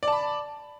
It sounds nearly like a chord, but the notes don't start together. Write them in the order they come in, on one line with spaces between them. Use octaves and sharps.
D5 A5 B5